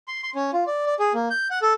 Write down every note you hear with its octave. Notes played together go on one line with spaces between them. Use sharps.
C6
C6
C#4
F4
D5
D5
G#4
A#3
G6
F#5
A4